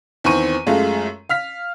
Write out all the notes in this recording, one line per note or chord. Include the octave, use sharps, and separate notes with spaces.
E2 D#3 C4 C#6 D#7
F#2 G#3 A3 F4
F5 F6 B6